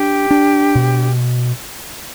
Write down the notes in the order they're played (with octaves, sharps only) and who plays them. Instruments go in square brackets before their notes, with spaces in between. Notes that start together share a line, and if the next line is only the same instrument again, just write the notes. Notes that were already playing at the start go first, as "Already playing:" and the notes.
Already playing: [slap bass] D4 [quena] G4
[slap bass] D4
B2